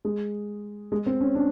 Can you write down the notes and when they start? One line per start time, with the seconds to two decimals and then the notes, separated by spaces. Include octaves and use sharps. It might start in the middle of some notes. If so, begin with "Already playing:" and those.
0.05 G#3
0.92 G#3
1.06 C4
1.21 C#4
1.35 D4